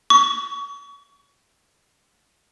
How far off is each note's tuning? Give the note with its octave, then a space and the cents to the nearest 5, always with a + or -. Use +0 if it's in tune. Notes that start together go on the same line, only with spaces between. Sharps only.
C#6 +35